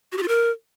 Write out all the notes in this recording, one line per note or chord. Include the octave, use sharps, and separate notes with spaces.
F#4
G4
F4
A#4